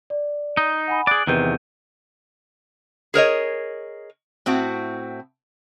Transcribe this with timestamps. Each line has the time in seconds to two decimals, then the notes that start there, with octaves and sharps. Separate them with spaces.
0.10 D5
0.57 D#4
0.88 F#5 G#5 B5
1.07 G#4 D5 F#6 D7 F#7
1.27 E2 C3 D#3 B4 G6 D#7
3.14 G#4 A#4 C#5 D#5
4.46 A2 C4 E4 F#4